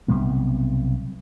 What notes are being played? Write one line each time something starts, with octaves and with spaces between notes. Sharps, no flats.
B1 C3 G3 B3